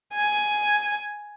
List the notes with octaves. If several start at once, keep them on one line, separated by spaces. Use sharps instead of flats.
G#5